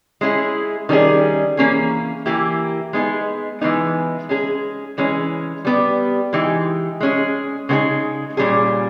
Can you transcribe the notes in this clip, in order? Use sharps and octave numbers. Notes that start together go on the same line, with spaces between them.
G#3 C#4 E4 G#4
D#3 G3 C#4 G#4
E3 A#3 C#4 G#4
E3 A#3 E4 G4
G#3 B3 D#4 G#4
E3 G#3 B3 D#4
G#3 C#4 G#4
E3 G#3 C#4
G3 B3 G4
E3 G#3 D#4 G4
G#3 C#4 G#4
C#3 G#3 B3 D#4 G#4
A#2 G3 C#4 G#4